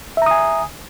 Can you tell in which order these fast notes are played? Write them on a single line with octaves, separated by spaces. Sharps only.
E5 A#5 D#6 G#5